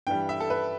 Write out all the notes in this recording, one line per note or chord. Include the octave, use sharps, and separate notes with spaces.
G2 E3 G3 G5
E5
A4
B4